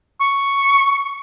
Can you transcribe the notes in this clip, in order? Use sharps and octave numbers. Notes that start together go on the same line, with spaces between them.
C#6